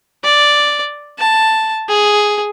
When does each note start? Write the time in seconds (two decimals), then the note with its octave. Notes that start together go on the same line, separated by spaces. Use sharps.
0.24 D5
1.19 A5
1.88 G#4